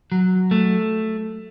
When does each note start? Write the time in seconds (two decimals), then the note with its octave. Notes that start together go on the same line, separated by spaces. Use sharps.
0.12 F#3
0.51 A3